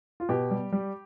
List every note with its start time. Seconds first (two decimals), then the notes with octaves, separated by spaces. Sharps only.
0.20 F4
0.29 B2 G4
0.51 G3
0.72 G3